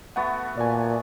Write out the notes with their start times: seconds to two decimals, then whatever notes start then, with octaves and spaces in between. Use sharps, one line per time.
0.16 A3 B3 F#4 F#5
0.57 A#2 D5 G#5